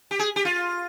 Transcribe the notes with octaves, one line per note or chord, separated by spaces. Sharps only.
G4
G#4
G4
F4